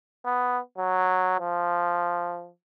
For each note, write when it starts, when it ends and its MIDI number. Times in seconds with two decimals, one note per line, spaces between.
0.25 0.59 59
0.78 1.36 54
1.40 2.49 53